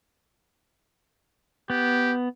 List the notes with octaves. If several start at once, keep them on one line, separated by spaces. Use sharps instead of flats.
B3 G4